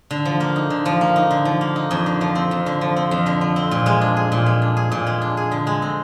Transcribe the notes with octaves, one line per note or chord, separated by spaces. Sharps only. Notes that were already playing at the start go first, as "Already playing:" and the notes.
D3
F3
A#3
D#4
D3
F3
A#3
D#4
D3
F3
A#3
D#4
F2
D3
F3
C4
F2
D3
F3
C4
F2
D3
F3
C4
A#2
G#3
D4
G#4
A#2
G#3
D4
G#4
A#2
G#3
D4
G#4
D3
G#3
C4